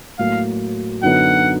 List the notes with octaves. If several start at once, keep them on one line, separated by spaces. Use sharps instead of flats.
A2 F#3 A#3 F5
F#2 D3 F#3 B3 D#4 F#5